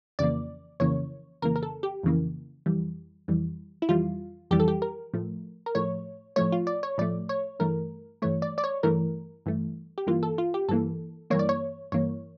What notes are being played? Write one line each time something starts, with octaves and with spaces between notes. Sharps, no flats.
F2 C#3 E3 A#3 D5
F2 C#3 E3 A#3 C#5
F2 C#3 E3 A#3 A#4
A#4
A4
G4
F2 C#3 E3 A#3
F2 E3 G3
F2 E3 G3
E4
F2 E3 G3 F4
F2 E3 G3 G4
A4
G4
A#4
A2 F3 A3
A#4
A2 F3 A3 C#5
A2 F3 A3 C#5
F4
D5
C#5
A2 F3 A3 D5
C#5
G2 E3 A3 A#4
G2 E3 A3 C#5
D5
D5
C#5
G2 E3 A3 A#4
G2 E3 A3
G4
G2 E3 A#3 F4
A4
F4
G4
G2 E3 A#3 A4
G2 E3 A#3 C#5
D5
C#5
G2 E3 A#3 C#5